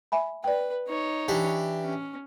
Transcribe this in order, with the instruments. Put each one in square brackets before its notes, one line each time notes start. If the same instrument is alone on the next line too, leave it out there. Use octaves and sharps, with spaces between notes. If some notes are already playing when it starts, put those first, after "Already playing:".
[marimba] E5 G#5 B5
[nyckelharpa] B4 [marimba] D5 G5
[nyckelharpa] D#4 C#5
[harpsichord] E3 D4 G4
[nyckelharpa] C#4